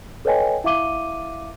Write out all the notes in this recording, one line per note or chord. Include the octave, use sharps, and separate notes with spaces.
A4 B4 C#5 D#5 G5 G#5
E4 E5 F5 D6 D#7 G7